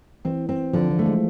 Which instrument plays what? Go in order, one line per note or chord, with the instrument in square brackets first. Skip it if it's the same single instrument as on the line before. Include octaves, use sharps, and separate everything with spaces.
[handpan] E3 [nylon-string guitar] C4
[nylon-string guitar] C4
[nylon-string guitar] D3 [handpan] F3
[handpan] E3
[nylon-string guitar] A3
[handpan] G#3